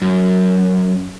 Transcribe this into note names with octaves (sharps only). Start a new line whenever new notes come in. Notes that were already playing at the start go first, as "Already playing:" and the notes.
F#2